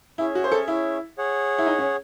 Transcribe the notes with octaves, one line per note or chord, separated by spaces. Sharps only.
C#4 E4 G#4 C#5 E5
F#4
C5
A4
E4
G#4 C#5 F#5
E4
D#4
C#4